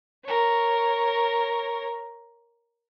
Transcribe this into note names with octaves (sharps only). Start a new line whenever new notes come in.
A#4 C#5